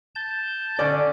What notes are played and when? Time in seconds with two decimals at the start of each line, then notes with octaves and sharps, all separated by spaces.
0.15 A5 G6
0.79 D3 C#4 D5